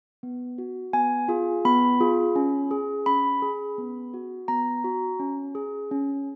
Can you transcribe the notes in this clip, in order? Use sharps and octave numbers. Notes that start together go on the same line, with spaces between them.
B3
F#4
B3 G#5
F4 G#4
B3 B5
F4 G#4
C#4
G#4
C#4 B5
G#4
B3
F#4
B3 A#5
F#4
C#4
G#4
C#4